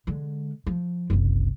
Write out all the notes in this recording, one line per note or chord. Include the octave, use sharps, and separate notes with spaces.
D3 G#3
F3
F#1 C2